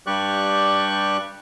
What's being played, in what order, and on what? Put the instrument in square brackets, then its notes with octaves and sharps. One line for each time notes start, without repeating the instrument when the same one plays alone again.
[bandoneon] G2 G3 G4 D5 C#6 F#6